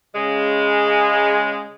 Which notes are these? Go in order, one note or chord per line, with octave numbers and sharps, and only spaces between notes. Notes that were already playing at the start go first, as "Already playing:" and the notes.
C#3 G#3